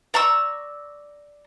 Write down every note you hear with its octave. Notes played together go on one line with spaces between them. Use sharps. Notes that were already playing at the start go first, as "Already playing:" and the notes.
D5 A#5 C#6 E6